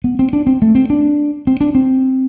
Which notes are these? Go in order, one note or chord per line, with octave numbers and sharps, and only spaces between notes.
B3
C4
D4
C4
A3
C4
D4
C4
D4
C4